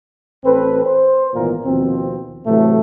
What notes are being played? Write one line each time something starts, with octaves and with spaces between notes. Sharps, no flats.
A1 C4 A4 B4
C5
G#1 A#2 E3 A#3 B3 A#4
D#2 B2 F3 C4
A2 C3 E3 F#3 A3